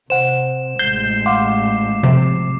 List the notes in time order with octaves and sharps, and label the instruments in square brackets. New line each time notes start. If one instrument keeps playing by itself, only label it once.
[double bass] C3 [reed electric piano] C5 F#5 [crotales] E7
[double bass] A1 G#3 [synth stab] G6 [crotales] C7
[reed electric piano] F5 F#5 C6 [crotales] D6
[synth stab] C3 [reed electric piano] F3